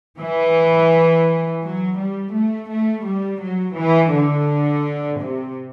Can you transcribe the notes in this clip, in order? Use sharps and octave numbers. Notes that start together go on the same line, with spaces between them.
E3
F#3
G3
A3
A3
G3
F#3
E3
D3
C3